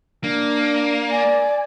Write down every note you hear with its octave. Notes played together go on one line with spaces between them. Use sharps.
A#3 D4
D5 G#5